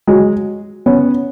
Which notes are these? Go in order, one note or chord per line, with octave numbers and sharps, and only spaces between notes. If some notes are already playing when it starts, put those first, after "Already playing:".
F#3 G#3
B3 C#4